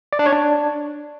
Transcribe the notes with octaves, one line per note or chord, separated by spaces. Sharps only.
D5
D4
C#5
D4